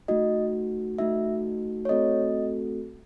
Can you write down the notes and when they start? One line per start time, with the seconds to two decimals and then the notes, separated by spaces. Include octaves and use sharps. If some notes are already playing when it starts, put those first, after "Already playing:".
0.08 A3 D#4 F#4 D#5
0.98 A3 D#4 F#4 E5
1.85 C#5
1.89 A3 C4 F#4 A4 D#5